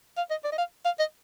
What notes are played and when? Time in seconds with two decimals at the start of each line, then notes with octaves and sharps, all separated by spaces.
0.17 F5
0.31 D#5
0.44 D5
0.52 D#5
0.58 F5
0.85 F5
0.99 D#5